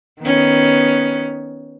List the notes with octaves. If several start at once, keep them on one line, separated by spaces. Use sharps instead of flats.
D#3 B3 C#4